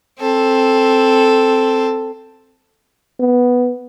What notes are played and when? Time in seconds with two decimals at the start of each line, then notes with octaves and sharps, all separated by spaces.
0.19 C4 A4
3.20 B3